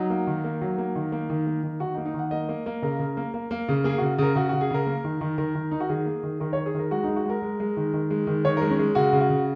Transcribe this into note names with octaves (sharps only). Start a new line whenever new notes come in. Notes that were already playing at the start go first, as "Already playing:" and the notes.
Already playing: F#3 D#4
A#3
D#3
A#3
F#3
A#3
D#3
A#3
D#3
A#3
D#3
D#3 F#4
D#4
A#3
D#4
D#3
F#5
A#3 D#5
A#3
A#3
C#3 A#4
C#3
A#3
A#3
A#3
C#3
A#3 G#4
C#3 F#4
C#3 A#4
C#3 F#4
C#3 F#4
G#4
C#3 A#4
A#3
D#3
D#3
D#3 A#4
D#3
D#3 D#4
F#4
D#3 G#4
A#3
D#3
D#3 A#4
D#3 C#5
G#4
D#3 A#4
G#3 F#4
G#3 D#4
F#4
G#3 A#4
G#3
G#3
D#3
D#3
G#3
D#3
D#3 C#5
G#3 A#4
C#4
G#3
C#3 F#4
C#3
F#4
C#3